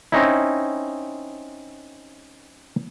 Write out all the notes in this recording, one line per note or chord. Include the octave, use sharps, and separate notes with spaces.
C4 C#4 D#4 E4